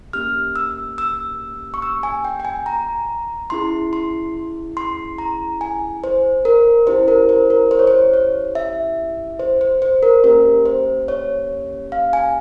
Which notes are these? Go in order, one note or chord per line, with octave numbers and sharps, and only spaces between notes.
A#3 C#4 G4 F6
E6
E6
C#6
E6
G#5
G5
G5
G#5
A#5
C#4 E4 G#4 C6
C6
C6
A#5
G#5
C5
A#4
C#4 E4 G4 C5
A#4
C5
A#4
C5
C#5
C5
C#5
E5
C5
C5
C5
A#4
A#3 C#4 G4 A#4
C5
C#5
F5
G#5